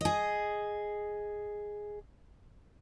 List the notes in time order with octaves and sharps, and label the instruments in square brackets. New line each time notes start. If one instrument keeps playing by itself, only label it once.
[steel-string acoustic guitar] G#4 D#5